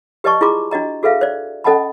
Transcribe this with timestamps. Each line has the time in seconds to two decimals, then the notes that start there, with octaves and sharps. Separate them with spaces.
0.24 G4 B4 D5 D#5 A5 C#6
0.41 E4 F4 G#4 A#5 C6 D6
0.71 D4 F#4 D#5 A#5
1.03 F#4 G#4 A4 B4 E5 F5
1.21 C5 D5
1.64 C#4 A4 D#5 F#5 A5 B5